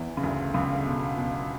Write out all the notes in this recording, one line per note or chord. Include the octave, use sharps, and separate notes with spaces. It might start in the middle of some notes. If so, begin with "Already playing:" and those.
Already playing: E2 E3
C#3
D2 D3
C#2 C#3
B2
B2